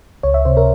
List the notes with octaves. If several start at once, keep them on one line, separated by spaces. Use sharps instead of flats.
C#2 C#5
E5
C3 C5
A#4